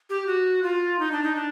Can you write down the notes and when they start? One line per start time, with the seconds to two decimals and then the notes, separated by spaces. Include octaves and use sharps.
0.10 G4
0.27 F#4
0.63 F4
0.99 D#4
1.12 D4
1.24 D#4
1.35 D4